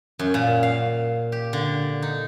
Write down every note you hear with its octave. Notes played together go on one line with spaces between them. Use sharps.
F#2
A#2
F5
G4
D3
D#4